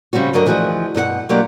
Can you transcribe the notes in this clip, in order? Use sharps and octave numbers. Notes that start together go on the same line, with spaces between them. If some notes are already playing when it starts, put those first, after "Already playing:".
C#3 G3 C4 C#4 F#4
G2 D3 F#3 F#4 A#4 D#5
D2 E3 F3 F#4 G#4 D#5
G2 B2 G4 F#5
B2 F#3 A#3 D4 F4 G4